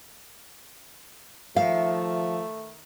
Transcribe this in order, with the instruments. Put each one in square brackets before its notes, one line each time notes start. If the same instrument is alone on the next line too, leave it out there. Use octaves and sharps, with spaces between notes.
[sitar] D#3 E5 [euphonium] F3 [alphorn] A3 [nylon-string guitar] F5